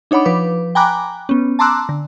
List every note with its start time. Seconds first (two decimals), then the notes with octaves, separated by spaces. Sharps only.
0.11 D4 D#4 C#5 F#5 B5 D6
0.25 F3 B4 D6
0.75 G5 G#5 A#5 B5 D6 F#6
1.29 B3 C#4
1.59 A5 A#5 C6 D6 E6 F#6
1.89 D3